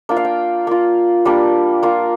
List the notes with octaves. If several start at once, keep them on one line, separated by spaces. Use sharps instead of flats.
A#3 D4 F4 G5
F5
G5
A#3 F4
G3 A#3 D4
A#3 F4